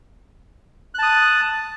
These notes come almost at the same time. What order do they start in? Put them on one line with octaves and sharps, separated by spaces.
F#6 A5 D#6